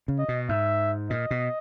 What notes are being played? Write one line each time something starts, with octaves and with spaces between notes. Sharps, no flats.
C#3
D#5
B2
G#2 E5
A#2 D#5
B2